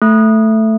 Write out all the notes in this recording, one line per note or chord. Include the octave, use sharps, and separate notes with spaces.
A3